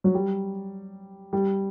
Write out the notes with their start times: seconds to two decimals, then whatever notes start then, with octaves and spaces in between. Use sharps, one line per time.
0.04 F#3
0.14 G3
1.33 G3